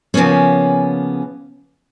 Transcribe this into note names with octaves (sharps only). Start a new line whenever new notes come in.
C#3 F3 A#3 B3 C#4